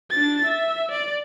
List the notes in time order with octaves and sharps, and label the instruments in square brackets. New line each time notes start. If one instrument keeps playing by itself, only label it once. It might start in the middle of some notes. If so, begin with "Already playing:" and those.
[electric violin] D4 A6
E5
D5